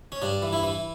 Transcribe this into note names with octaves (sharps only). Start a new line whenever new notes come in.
C#4
G2 D4
E3
E4
E3